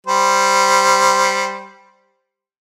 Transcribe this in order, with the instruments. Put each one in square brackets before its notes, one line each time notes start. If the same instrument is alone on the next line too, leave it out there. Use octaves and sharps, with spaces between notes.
[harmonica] G3 C5